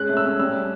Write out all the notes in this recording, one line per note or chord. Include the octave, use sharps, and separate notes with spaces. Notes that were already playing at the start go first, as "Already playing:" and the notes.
Already playing: G#3 C#4 F#6
A3
E6
C#4
G3 E6